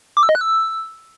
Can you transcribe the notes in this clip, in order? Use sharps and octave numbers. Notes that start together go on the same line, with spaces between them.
D6
E6
D#5
F#6
E6